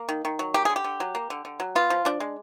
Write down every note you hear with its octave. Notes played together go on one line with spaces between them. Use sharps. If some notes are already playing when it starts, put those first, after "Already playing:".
Already playing: A#3
D#3
D#3
F#3
A#3 G4
D3 G#4
G4
D3
F#3
A#3
D3
D3
F#3
B3 F4
F3
F3 D4
G#3